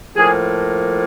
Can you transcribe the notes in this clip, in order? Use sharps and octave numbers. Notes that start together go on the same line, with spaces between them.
A2 F3 A#3 G#4